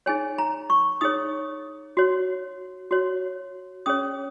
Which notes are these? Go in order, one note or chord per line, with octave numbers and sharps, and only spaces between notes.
D#4 G#4 C#5 G#5
A#5
C#6
D#4 G#4 C#5 D#6
F#4 C#5
F#4 C#5
C#4 G#4 C#5 D#6